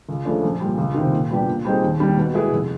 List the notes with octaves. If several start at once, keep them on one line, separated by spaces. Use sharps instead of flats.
C#2
C#3 F3 A3 D4
A#1
A#2 G3
C#2
C3 D#3
A#2
G3 B3 D4 G4
A#2
G3 C4 D#4 G#4
D#2
D#3 G3 A#3
B2
G#3 B3 E4 G#4
F1